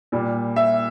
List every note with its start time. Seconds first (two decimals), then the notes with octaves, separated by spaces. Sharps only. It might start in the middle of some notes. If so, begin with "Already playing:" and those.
0.12 A#2 G3
0.56 E5